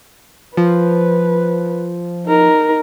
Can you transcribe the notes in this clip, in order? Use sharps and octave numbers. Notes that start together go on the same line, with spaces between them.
F3 B4
D#4 A#4